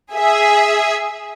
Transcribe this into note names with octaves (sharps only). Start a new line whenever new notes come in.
G#4 E5